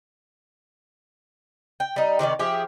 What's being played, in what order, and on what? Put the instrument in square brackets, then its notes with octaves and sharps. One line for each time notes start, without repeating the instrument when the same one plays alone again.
[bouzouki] G5
G3 D#4
C3 D#3 C#4 D5
F3 G4 G#4 E5